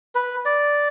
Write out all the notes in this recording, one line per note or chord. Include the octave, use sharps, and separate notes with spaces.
B4
D5